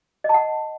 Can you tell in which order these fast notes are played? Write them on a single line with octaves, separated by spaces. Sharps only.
D#5 A5 F#5